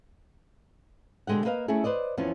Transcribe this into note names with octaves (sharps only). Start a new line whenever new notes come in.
B2 D3 G#3 G4 F#5
A#3 B4 D#5 F5
A3 C#4 E4 G#4
B4 C5 D5 D#5
E2 F3 B3 C#4